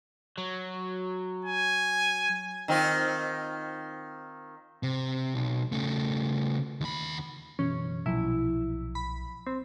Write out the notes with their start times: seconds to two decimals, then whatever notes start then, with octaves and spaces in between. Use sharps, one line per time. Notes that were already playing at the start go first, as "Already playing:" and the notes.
0.38 F#3
1.45 G#5
2.68 D#3 C4 F4
4.83 C3
5.34 B1
5.72 C#3 A3
6.81 D#2 B5
7.59 F#1 B2 E3 C#4
8.06 B1 A#2 F3 F#3 E4
8.95 B5
9.47 C4